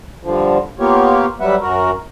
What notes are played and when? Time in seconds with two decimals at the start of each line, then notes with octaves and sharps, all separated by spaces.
0.23 G2 D3 F3
0.79 A#3 B3 F4 G4 C#5
1.41 F#3 G3 B4 E5 F#5
1.61 F#2 F#4 A#4